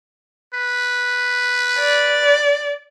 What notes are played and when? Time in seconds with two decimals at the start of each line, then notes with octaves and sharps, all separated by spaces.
0.54 B4
1.79 D5